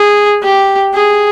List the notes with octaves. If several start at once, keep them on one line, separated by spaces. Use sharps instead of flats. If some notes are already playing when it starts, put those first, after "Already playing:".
Already playing: G#4
G4
G#4